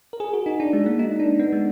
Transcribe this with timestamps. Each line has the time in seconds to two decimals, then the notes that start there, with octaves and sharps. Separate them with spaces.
0.13 A#4
0.20 G#4
0.33 F#4
0.46 D#4
0.60 D4
0.73 G#3
0.86 A#3
0.99 D#4
1.20 D4
1.39 B3
1.53 G#3